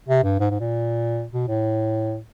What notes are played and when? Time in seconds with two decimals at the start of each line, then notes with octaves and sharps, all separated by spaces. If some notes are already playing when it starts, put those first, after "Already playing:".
0.09 C3
0.24 G2
0.40 G#2
0.51 G#2
0.60 A#2
1.33 B2
1.48 A2